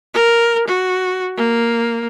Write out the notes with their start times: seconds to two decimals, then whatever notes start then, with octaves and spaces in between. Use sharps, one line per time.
0.14 A#4
0.67 F#4
1.36 A#3